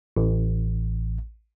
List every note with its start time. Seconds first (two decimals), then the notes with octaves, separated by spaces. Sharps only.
0.17 A1